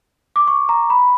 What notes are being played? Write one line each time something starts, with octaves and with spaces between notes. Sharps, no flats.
D6
C#6
A#5
B5